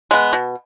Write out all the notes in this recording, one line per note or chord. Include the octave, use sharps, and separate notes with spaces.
G#3 B3
B2